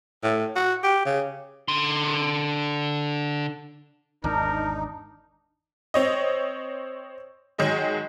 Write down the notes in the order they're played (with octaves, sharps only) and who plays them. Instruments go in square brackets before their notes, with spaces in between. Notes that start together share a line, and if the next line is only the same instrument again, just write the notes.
[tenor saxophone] A2
F#4
G4
C#3
[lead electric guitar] D3 C6
[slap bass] G#1 E2 [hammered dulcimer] D4 [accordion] D#4 [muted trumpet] A#4
[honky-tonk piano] C4 C#5 D#5
D#3 F#3 G#3 D#4